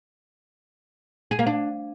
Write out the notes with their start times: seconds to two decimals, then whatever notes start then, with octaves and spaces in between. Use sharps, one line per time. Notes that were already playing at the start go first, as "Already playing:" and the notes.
1.31 G#4
1.39 A#3
1.47 D4